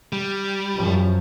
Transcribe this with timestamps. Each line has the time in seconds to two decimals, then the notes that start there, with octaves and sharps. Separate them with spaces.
0.13 G3
0.77 F#2 F3